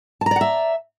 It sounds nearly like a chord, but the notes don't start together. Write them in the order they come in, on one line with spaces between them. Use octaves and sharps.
A5 A#5 D5 F#5 E5